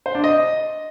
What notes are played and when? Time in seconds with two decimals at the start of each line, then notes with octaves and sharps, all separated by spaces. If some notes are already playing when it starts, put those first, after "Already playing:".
0.06 C5
0.15 D4
0.24 D#5